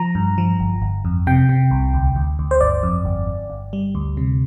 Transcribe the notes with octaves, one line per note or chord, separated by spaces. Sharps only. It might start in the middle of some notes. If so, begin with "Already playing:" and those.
Already playing: F3 A#5
G2
F3
G1
G1
F2
C3 G5
C3
C2
D2
D2
D2
C5
G1 D5
F2
G1
G1
G1
G3
D2
C3